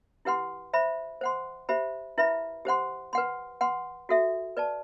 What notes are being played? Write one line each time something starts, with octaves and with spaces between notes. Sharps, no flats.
E4 G4 B4 F#5 C6
C5 E5 B5
C5 F#5 C6
G4 C5 E5 B5
E4 B4 E5 B5
G4 C5 F#5 C6
B4 F#5 C6
B4 F#5 C6
F#4 A4 E5
B4 D5 A5